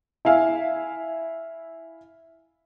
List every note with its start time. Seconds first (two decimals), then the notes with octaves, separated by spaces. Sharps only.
0.25 E4 E5 F5 G#5